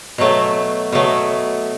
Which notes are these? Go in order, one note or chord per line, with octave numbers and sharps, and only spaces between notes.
B2 F#3 A3
B2 F#3 A3